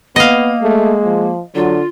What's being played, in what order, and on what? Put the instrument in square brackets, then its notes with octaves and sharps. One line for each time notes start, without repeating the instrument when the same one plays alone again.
[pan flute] A#3 [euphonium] B3 [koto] D#5 F5
[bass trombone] G#3 [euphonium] A3
[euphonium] F3
[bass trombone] D3 [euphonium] F#3 [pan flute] F4